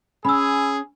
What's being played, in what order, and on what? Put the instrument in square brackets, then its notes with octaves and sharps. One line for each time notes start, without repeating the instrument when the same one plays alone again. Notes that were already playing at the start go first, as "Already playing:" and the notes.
[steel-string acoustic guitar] C#4 [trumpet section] G#4 [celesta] B5 E6